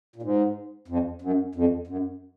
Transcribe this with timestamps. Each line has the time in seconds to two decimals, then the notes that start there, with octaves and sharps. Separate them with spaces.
0.16 A#2
0.22 G#2
0.88 F2
1.22 F#2
1.55 F2
1.87 F#2